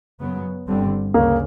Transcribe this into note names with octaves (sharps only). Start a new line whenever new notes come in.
F#2 C#3 F#3 B3
G1 G2 D3 G3 C4
D2 C#3 A#3